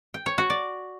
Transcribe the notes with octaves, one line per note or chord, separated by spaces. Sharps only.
G5
C#5
F#4
D5